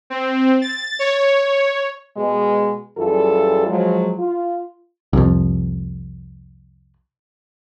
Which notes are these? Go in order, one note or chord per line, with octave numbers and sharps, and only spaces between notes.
C4
A6
C#5
C#5
B2 G#3
F#2 E3 G3 F4 G#4 A4
F3 F#3 G#3
F4
C2 F2